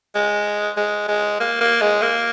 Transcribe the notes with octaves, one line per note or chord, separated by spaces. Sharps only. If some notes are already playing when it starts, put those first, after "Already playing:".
G#3
G#3
G#3
A#3
A#3
G#3
A#3